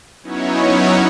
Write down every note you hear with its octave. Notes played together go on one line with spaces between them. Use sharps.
F#3 B3 C#4 D#4 E4 C#5